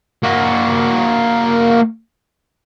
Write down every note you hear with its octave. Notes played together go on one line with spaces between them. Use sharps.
A#3 F#4